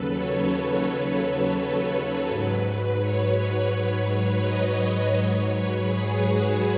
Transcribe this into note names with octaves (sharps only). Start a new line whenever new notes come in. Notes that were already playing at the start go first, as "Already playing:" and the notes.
Already playing: D#2 C#3 F#3 A4 B4
C#5
C#5
B4
G#2 F#3
C#5
B4
C#5
D#5
B4
G#2 F#3 C#5
B4
G#4
F#4